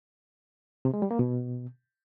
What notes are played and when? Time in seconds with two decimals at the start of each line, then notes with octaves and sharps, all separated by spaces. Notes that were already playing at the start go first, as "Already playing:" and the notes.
0.85 C3
0.94 G#3
1.02 G3
1.11 A#3
1.19 B2